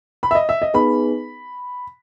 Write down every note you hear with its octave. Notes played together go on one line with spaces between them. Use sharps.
B5
E5
D#5
E5
D#5
B3 D#4 G#4 B4 B5